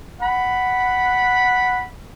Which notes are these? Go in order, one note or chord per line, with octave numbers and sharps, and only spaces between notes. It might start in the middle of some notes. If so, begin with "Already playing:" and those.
F#5 B5